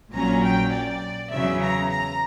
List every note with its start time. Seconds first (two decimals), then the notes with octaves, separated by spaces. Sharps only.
0.13 A#1 A#2 F#3 C#4 A#5
0.43 G5
0.72 D5
1.31 E2 C#3 F#3 C#4 E5
1.60 A#5
1.90 A#5